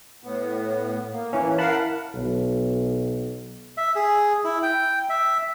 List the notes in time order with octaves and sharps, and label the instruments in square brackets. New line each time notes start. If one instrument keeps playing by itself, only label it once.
[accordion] A2 B3
A#3
[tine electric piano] E3 C#4
[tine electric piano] E4 A5 B5 [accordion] A#4 F5 F#5
[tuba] B1
[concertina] E5
G#4
E4
G5
E5